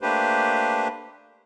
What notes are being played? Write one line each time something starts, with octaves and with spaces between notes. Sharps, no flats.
A3 A#3 D4 G4 B4 C5